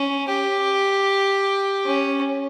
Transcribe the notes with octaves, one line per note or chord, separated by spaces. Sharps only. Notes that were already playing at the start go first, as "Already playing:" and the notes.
Already playing: C#4
G4
C#4